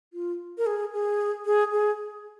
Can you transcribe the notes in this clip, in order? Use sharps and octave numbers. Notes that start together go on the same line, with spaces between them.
F4
A#4
G#4
G#4
G#4
G#4